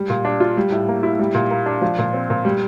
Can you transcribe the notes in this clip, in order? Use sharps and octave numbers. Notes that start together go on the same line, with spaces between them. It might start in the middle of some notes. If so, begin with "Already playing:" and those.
Already playing: G3
A#2
D4
F4
G3
A2
A#3
E4
G3
A#2
A#3
D4
F3
A#2
C4
A#2
G3